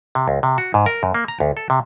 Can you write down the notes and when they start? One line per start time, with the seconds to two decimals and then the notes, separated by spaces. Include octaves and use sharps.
0.15 C3
0.28 C#2
0.43 C3
0.58 F#4
0.74 G#2
0.86 A#4
1.03 F#2
1.14 A#3
1.28 A#5
1.40 D2
1.57 A4
1.70 C3